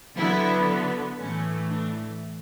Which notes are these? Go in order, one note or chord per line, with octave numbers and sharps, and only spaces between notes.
D3 F#3 B3 E4
A2 E3 A3 C#4
D4